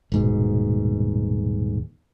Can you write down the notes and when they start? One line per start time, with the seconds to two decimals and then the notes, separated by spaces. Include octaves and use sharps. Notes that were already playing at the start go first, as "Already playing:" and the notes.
0.12 D#1 G#2 B2